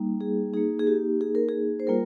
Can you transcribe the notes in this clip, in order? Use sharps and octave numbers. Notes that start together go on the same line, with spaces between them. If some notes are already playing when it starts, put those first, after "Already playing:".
Already playing: G3 A#3 D#4
G#4
A#3 D#4 G#4
G#4
G4
G#4
A#4
G#4
C5
G3 A#3 F4 A#4